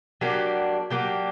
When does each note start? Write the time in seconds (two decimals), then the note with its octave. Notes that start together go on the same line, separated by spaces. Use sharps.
0.21 F#3 A#3 D4 G4
0.90 F#3 A#3 D4 G4